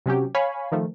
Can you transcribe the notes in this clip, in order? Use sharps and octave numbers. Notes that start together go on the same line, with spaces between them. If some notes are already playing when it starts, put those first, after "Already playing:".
C3 F#3 C#4 G4
C#5 F5 G#5 B5
D#3 F3 A3